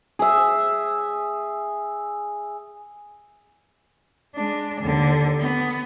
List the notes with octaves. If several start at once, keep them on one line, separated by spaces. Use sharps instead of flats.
G#4 E5
G#3 D4
D#2 D3
B3